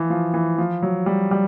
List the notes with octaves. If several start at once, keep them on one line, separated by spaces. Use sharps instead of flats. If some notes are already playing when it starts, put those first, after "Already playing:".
Already playing: E3 F3
F3
E3
F3
F#3
G3
G3